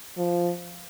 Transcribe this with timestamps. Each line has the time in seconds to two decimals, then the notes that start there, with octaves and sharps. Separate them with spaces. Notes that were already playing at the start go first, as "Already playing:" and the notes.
0.17 F3